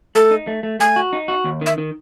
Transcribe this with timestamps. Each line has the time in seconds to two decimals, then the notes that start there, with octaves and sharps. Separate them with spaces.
0.15 A3 A4
0.31 D#4
0.47 A3
0.63 A3
0.79 A3 G#5
0.96 F#4
1.13 D#4
1.28 F#4
1.44 D#2
1.61 D#3 E5
1.78 D#3